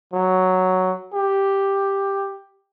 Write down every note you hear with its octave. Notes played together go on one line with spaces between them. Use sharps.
F#3
G4